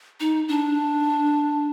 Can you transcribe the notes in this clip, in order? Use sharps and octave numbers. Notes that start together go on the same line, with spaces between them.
D#4
D4